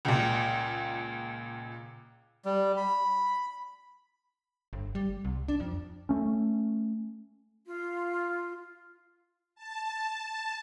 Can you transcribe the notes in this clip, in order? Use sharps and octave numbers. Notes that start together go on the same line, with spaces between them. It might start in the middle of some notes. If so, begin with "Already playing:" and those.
C#2 A#2
G3
B5
G1
G3
C2
D4
F2
A3 C#4
F4
A5